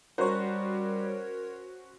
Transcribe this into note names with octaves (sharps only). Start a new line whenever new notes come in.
G3 C#4 F#4 A#4 C5 C#5